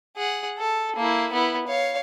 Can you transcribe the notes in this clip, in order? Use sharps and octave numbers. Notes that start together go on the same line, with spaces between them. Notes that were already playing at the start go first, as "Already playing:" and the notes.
G#4 F#5
A4
A#3 E4
B3 E4
C#5 F5